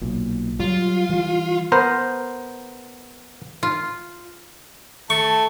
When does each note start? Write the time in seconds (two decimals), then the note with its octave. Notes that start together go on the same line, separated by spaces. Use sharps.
0.02 B1 A#2
0.60 F#3 G3 F4
1.09 E3 G3
1.72 B3 A#4 C5
3.63 F4
5.10 A3 A5 C#6